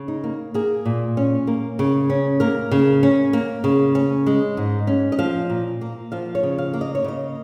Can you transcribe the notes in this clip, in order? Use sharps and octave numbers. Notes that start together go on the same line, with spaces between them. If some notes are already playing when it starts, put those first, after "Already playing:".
Already playing: C#3
D#4
A#3
A#3 G#4
A#2
C#4
A#3
C#3
C#4
A#3 A#4
C#3
C#4
A#3
C#3
C#4
G#3
G#2
C#4
D#5
F3 F5
A#2
A#3
F3 F5
C#5
C#3
F5
A#3
D#5
C#5
C#3 D#5